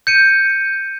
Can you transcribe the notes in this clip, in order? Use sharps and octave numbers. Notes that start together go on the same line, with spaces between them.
G6 C#7 D#7